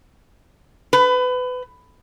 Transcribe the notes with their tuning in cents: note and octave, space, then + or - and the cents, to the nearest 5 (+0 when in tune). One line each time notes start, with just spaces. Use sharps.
B4 +25